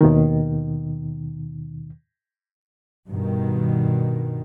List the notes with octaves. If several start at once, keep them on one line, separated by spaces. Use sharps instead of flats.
D#2 B2 D#3
G2 B2 D#3